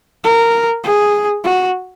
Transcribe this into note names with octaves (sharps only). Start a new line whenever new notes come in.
A#4
G#4
F#4